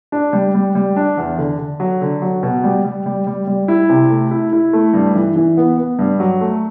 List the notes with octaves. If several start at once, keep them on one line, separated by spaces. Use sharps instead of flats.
D4
G3
G3
G3
D4
E2
D3
D3
F#3
D3
F#3
B2
G3
G3
G3
G3
G3
E4
C3
A3
E4
E4
A3
G2
E3
E3
B3
B3
G2
F#3
A3